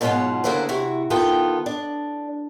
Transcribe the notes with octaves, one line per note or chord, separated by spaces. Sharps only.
G#2 B2 F#3 A3 F4 F#5
D2 C#3 A#3 E4 C5 F#5
C3 E4 F#4
D#3 B3 F4 A4 G5
D4